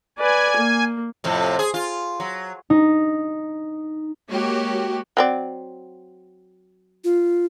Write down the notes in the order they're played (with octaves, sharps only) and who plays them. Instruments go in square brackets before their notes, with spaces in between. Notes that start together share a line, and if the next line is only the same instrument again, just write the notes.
[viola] B4 D5 [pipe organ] G#5
[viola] A#3
[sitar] F2 A2 C3
G#4
F4
F#3
[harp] D#4
[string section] G#3 A#3 F#4 G4 C#5
[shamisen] F#3 C4 D5
[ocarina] F4